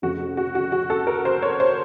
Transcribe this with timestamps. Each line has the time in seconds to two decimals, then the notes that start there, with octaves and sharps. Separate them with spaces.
0.02 F1 F2 C#3 F#4
0.37 F#4
0.55 F#4
0.72 F#4
0.90 A4
1.07 A#4
1.25 C5
1.42 C#5
1.60 C5